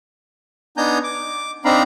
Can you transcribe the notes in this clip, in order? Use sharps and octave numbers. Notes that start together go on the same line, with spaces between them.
B3 D4 D#4 G#5 A#5 G6
D6
C4 D4 D#4 F5 A#5 B5